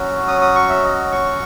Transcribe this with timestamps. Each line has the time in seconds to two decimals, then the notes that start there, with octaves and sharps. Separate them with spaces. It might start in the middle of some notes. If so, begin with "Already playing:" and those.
Already playing: F#3 C#4 F#4
0.28 D#6
0.42 D#6
0.55 C#6
0.69 E5
0.83 D#5
1.12 C#6